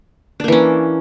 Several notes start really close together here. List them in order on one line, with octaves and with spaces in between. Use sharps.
D4 A#3 E3 C#4